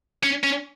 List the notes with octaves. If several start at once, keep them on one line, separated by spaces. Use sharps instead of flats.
C#4
C#4